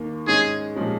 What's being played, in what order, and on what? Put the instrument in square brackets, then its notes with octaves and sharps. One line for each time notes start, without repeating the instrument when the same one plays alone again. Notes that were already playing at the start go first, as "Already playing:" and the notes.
Already playing: [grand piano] D#2 D#3 A#3
[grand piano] G#2 G#3 C#4 [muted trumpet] G#4
[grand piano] A#2 F3 G#3 C#4